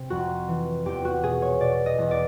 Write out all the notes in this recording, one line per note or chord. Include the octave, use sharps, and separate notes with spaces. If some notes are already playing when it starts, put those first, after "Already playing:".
Already playing: C3
F2 F#4
E3
E2 G4
F#4
B2 G#4
C#5
B2 D5
D#5
E2
D5